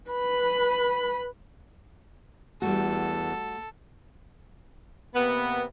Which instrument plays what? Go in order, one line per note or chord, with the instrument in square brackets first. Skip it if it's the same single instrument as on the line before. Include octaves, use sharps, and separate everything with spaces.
[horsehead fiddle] B4 B5
[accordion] E2 [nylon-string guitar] G3 A3 F#4 [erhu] A4
[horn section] C3 A#3 B3